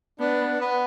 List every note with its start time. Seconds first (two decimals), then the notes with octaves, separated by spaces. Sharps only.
0.19 B3 D4
0.61 B3